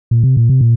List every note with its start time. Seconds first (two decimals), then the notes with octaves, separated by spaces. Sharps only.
0.11 A#2
0.23 C3
0.37 A#2
0.49 C3
0.61 A#2